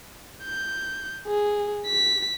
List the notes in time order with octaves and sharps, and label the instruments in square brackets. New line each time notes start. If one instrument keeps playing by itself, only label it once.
[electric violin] G6
G#4
B6